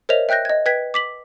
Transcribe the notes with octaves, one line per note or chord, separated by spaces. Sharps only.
A#4 C5 C#5 D#5 E5 F7
E5 G5 F#6 G6 A#6
D#5 G#6
B4 G5 G#6 B6
D6 B6 F#7